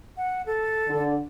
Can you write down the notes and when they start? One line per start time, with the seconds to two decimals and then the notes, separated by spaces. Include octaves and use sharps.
0.17 F#5
0.46 A4
0.88 D3